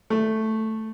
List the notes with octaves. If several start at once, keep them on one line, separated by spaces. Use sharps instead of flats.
A3